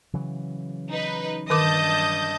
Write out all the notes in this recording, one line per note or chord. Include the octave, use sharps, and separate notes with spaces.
C#3 E3 F#3
D#4 B4
G2 D#3 A#4 D#5 A5 D6 D#6 G6